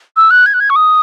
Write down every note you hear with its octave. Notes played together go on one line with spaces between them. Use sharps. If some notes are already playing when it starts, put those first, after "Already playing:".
E6
F#6
G#6
F#6
G#6
C#6
D#6